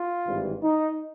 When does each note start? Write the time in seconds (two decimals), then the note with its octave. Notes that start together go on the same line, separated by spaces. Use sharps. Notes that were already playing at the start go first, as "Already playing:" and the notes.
Already playing: F4
0.26 G#1 G2 E3
0.63 D#4